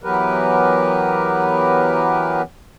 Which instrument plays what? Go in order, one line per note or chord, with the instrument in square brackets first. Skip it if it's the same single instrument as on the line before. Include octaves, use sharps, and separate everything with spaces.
[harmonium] E3 F#3 B3 G4 A#4 B4